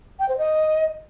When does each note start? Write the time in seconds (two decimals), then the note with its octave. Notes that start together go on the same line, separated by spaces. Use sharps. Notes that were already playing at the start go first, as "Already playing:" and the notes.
0.19 G5
0.29 C5
0.38 D#5